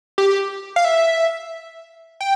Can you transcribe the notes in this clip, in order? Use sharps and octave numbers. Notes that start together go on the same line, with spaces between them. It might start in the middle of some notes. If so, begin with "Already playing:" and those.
G4
F5
E5
G5